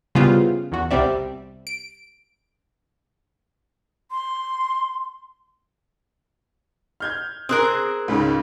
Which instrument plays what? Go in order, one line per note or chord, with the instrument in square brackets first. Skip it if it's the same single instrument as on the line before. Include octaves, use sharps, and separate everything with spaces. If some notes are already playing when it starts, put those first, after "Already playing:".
[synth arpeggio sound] C#3 G3 B3 E4 F4 C5
E2 F#4
C2 C3 G3 C4 D5 E5
D7
[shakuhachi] C6
[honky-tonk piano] F6 G6 G#6
[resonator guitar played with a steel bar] C4 G#4 A#4 [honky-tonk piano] D#6 F#6
[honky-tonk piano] C#2 G#2 C#3